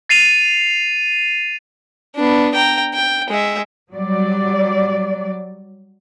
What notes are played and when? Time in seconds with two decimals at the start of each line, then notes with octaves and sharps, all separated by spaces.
0.09 A6 C7 D#7 F7
2.16 B3 D4
2.55 G5 A#5
2.94 G5
3.30 G#3 E5
3.92 F#3 G3 D5